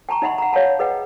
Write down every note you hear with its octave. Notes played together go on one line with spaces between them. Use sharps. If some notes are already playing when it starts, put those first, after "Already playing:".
G5 A5 A#5 C#6
D#4 D#5 E5 F#5 B5 C6
F#5 A#5
C#5 F5 F#5 A5 B5
G#4 B4 D#5 F#5 G5